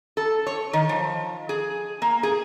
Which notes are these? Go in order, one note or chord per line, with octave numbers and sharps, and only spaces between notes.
A4
C#5
D#3
F3
G#4
A#3
G#4